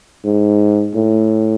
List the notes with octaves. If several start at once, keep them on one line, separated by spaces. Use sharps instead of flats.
G#2
A2